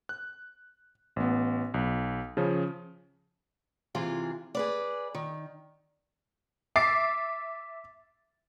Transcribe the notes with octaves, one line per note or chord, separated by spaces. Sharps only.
F#6
A1 B3
B1
C#3 F3 C#4
C3 E3 F4 G#4
G#4 B4 D5
D#3
E5 D6 A6 C7